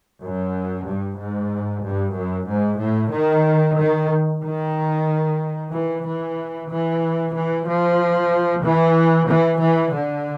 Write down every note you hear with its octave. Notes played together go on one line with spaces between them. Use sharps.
F#2
G2
G#2
G2
F#2
G#2
A2
D#3
D#3
D#3
E3
E3
E3
E3
F3
E3
E3
E3
D3